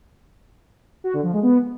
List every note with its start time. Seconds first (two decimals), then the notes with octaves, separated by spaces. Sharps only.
1.04 F#4
1.14 D3
1.23 F3
1.33 G#3
1.43 B3